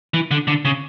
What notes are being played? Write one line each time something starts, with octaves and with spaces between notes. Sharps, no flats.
E3
D3
D3
C#3